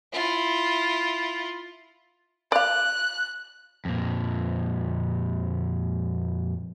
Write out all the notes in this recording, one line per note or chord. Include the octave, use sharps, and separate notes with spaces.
E4 F4
D5 F5 F#6
F2 A#2